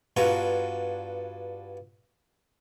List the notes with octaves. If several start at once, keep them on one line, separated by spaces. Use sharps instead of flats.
G2 B3 D4 F4 F#4 A#5